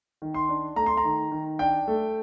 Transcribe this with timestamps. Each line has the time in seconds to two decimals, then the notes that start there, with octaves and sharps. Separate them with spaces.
0.22 D#3
0.34 C6
0.49 D4
0.76 A3 A#5
0.86 C6
0.97 A#5
1.04 D#3
1.32 D#3
1.59 D4 G5
1.88 A3